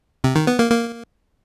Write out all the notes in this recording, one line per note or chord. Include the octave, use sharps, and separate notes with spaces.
C3
D#3
B3
A#3
A#3